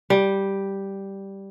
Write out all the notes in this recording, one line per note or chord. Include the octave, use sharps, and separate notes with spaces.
G3